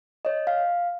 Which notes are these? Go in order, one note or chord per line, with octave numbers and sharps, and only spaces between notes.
C#5 D#5
F5